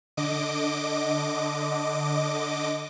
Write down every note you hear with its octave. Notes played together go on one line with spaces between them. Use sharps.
D3 D#5 D6